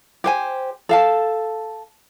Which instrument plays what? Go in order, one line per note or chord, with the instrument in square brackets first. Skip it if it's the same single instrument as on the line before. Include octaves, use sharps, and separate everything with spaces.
[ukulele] G4 C5 G#5
A4 F5 A5